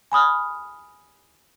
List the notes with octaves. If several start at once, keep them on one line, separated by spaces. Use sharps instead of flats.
G#5 B5 D#6 F6